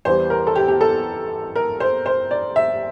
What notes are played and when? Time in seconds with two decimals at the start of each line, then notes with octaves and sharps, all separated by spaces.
0.05 E2 E3 G3 C5
0.30 A#4
0.47 A4
0.56 G4
0.68 G4
0.81 A4
1.55 A#4
1.80 C5
2.06 C5
2.31 D5
2.56 E5